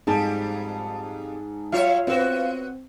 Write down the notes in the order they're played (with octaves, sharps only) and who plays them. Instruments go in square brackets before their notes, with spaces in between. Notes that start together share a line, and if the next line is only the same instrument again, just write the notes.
[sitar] F2 G3 [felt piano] G#2 A5 [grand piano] G#4
[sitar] F#3 C#5 E5 [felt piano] F4 [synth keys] F5
[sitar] B3 F#4 [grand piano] C4 C5